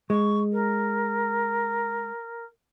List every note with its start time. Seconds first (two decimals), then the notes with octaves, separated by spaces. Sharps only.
0.10 G#3 C#6
0.52 A#4